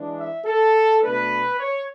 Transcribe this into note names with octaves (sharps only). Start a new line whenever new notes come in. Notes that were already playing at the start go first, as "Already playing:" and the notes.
Already playing: E3 G#3 D4
E5
A4
B2 A3 D4 B4
C#5